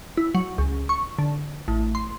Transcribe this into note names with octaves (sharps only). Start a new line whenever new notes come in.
E4
F#3
C#2
C#6
D3
A1
C6